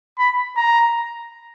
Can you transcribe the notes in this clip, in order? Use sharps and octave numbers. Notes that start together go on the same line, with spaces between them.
B5
A#5